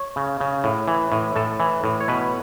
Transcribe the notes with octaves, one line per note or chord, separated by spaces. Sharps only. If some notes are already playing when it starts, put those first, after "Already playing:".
Already playing: C#5
C#3
C#3
A2
E3
A2
A2 A4
E3
A2
C#5
B2 B4